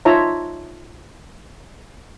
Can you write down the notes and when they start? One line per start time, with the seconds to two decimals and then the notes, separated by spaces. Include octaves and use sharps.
0.05 D#4 F4 C#5 E5 A5 A#5